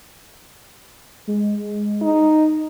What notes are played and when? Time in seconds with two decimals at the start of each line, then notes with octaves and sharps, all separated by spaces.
1.27 G#3
2.02 D#4